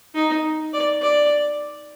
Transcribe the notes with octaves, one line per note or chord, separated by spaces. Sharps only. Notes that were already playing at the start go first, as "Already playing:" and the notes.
D#4
D5
D5